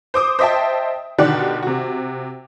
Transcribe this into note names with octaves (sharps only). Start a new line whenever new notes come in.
C5 D6 D#6
C5 D#5 E5 G5 A5
B2 D3 D#3 G4 D5 F#5
C3 F#4